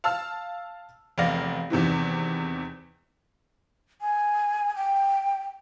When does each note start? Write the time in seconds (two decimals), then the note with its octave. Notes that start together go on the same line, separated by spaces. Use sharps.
0.04 F5 A5 E6 F6
1.18 F1 E2 D5 F5 A#6
1.70 E2 C3 D#3 E3
4.02 G#5
4.76 G5